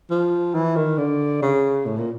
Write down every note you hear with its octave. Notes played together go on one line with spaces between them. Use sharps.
F3
E3
D#3
D3
C#3
A2
A#2